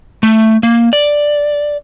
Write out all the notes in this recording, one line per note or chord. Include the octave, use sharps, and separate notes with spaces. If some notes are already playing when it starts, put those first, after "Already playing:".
A3
A#3
D5